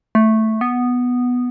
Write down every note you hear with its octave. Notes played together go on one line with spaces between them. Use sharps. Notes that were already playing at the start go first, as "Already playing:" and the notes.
A3
B3